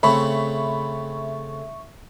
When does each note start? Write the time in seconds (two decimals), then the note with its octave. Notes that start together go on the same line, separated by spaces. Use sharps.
0.03 C#3 A3 C4 E5 B5 C#6